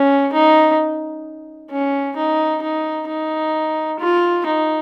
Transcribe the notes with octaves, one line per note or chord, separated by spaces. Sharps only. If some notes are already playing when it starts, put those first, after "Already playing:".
Already playing: C#4
D#4
C#4
D#4
D#4
D#4
F4
D#4